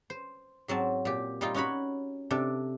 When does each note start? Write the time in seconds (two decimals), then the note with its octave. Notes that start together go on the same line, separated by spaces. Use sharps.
0.10 C5
0.68 G#2 F#3 C4 A5
1.05 A#2 G4
1.41 G3 D#4 F4
1.54 C#4 D#4 F#4 C#5 B5
2.31 C3 D4 A4